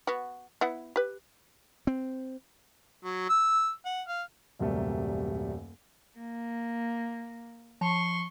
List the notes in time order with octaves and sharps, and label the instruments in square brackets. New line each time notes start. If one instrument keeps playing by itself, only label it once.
[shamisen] B3 F#4
B3 E4 F#5
G4 B4
[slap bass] C4
[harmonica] F#3
E6
F#5
F5
[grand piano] D#1 F#2 C3 G3 A3 A#3
[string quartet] A#3
[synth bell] F3 A5 [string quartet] C6 C#6